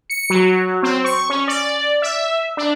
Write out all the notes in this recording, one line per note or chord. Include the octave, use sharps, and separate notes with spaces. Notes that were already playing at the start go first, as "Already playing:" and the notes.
C#7
F#3
C4
C#6
C#4
D5
E5
D4